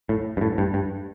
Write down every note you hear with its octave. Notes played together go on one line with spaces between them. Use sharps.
A2
G2
A2
G2
G2